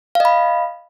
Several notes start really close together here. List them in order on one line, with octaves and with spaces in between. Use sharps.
F5 D#5 B5